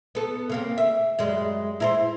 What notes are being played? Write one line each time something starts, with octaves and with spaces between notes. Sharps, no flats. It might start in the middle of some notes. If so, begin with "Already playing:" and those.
B3 A4
C#3 A#3 C4
E5
F#2 G3 G#3
E4 A#4 C5